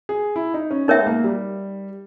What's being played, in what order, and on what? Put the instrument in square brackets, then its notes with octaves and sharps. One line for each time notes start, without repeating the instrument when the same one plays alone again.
[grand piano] G#4
E4
D#4
C#4
[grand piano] B3 [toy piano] D#4 A#4 C#5 E5 G5
[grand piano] G#3
A#3
G3